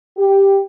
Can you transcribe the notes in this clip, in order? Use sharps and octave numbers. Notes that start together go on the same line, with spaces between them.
G4